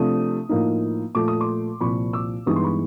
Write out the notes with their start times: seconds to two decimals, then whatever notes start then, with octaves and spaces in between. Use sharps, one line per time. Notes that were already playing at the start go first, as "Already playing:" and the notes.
Already playing: C3 F3 A3 D4 D#6
0.49 A2 F3 A#3 D#4
1.15 A#2 F3 A3 D6
1.28 D#6
1.40 C6 D6
1.80 C2 A#2 F3 B5 C#6
2.13 D6 E6
2.46 G2 E3 G#3 B3 D#4 C#6 D#6
2.56 C6
2.63 B5 C#6